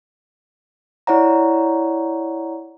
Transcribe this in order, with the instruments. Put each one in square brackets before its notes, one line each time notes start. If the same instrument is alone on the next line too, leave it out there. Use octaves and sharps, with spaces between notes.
[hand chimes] E4 C#5 D5 F#5 A#5